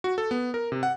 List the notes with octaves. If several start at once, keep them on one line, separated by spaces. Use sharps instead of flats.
F#4
A4
B3
A#4
C3
F#5